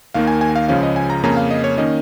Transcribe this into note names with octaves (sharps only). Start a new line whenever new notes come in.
D#2 D#3 A#3 F5
G#5
G#5
F5
C#2 C#3 F3 C#4 F5
D#5
G#5
A#5
F2 C#3 A#3 C#4 A#5
F5
D#5
C#5
D#3 A#3 C#4 D#5